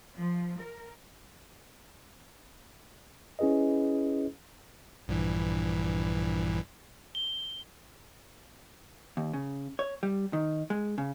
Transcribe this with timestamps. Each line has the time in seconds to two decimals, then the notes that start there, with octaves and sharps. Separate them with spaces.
0.16 F3
0.60 A#4
3.39 C#4 E4 G#4 B4 D#5
5.08 A#1 G2 E3
7.15 G7
9.17 D#2
9.33 C#3
9.79 C#5
10.03 G3
10.33 D#3
10.70 G#3
10.98 C#3